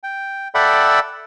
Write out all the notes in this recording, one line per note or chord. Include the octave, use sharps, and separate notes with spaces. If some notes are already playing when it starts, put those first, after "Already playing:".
G5
A4 D5 E5 F#5 G5 B5